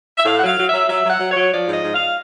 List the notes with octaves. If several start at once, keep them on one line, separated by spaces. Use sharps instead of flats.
E5
A2 F5
F#5
F#3 F5
F#3
F#3 E5
F#3 E5
F#3 F#5
F#3
F#3 C#5
F3 D5
G#2
D#5
G#2
F5